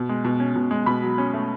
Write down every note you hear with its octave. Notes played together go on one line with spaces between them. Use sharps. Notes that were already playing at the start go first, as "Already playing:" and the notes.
Already playing: B2
G#3
B2
C#4
B2
G#3
B2 B5
F#3
C#4
A3